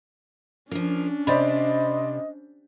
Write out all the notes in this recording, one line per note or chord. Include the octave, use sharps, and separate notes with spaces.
F3 A#3 C#4 D4
C3 C5 D5 D#5 B5